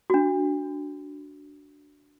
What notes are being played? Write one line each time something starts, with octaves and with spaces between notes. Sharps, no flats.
D4 F#4